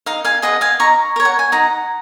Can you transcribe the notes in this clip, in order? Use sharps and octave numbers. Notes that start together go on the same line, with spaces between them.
D#4 F5
F5 G#5
G#4 B4 D#5 F#5
F5 G#5
D#4 A#5 C#6
A#4 C#5
F#5
G#5
D#4 F#5 A#5